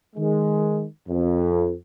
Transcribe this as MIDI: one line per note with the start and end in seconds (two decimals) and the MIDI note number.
0.16 0.85 51
0.16 0.85 56
1.08 1.74 41